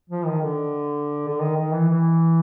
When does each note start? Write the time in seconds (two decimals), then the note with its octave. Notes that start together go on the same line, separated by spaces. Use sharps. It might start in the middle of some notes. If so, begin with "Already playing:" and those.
0.10 F3
0.26 D#3
0.42 D3
1.28 D3
1.40 D#3
1.56 D#3
1.72 E3
1.89 E3